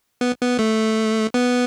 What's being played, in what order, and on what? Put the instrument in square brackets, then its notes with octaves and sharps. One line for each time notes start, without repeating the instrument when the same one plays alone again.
[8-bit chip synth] B3
B3
A3
B3